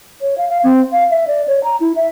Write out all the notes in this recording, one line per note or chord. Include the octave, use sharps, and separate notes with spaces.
C#5
F5
F5
C4
F5
E5
D5
C#5
A#5
E4
E5